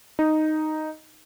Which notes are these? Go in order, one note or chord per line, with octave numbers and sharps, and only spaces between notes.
D#4